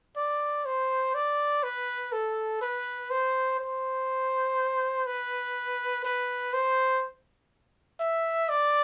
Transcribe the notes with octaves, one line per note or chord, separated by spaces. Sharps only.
D5
C5
D5
B4
A4
B4
C5
C5
B4
B4
C5
E5
D5